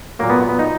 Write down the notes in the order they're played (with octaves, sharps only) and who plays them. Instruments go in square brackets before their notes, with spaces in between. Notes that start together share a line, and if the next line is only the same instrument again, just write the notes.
[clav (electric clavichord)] A#2 F#3 A#3
B3
B3
D#4